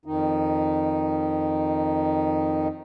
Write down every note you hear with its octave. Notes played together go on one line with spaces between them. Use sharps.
F2 D#3 D#4